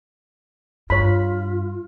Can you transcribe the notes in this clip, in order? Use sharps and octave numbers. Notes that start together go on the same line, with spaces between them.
G2 F4 C#5 B5